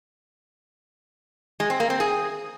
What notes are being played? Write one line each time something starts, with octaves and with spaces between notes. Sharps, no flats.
G#3
C4
A#3
C4
G#4